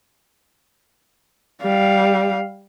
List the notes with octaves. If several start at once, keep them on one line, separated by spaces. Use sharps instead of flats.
G3 F5